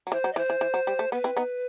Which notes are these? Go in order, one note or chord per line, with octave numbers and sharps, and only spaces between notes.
F#3
E3 C5
F#3
D#5
E3 C5
E3
E3
F#3
G3
A3
B3 B4
C4 E4
B3 D#4